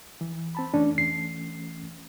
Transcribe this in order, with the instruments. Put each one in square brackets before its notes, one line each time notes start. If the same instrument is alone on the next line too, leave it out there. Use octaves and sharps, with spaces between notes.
[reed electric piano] E3
C4 A5 B5
[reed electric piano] E3 A3 C#4 [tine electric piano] D4
[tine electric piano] C7